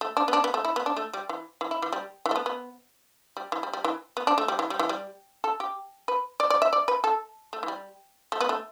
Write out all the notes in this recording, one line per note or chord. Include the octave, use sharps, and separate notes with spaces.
A3
D4
B3
D4
B3
A3
E4
B3
D4
A3
G3
E3
E3
E4
E3
G3
E3
A3
B3
B3
G3
E3
G3
G3
E3
B3
D4
A3
G3
E3
G3
E3
G3
A4
G4
B4
D5
D5
E5
D5
B4
A4
A3
E3
G3
A3
B3
A3